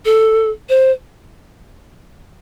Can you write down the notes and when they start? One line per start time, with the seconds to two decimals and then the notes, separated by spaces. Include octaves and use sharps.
0.05 A4
0.69 C5